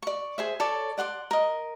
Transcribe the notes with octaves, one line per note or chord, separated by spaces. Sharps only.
D5 C#6
G#4 C5 E5
A4 C#5 D5 A5
D5 F#5 C6 D6
A#4 D#5